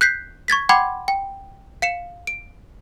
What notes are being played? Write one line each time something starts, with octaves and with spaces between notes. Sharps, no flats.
F#6 G6 B6 C7
C#6 G#6 A6 B6
F#5 G5 B5 C6 D6 G#6
G5
F5 C#7 E7
D7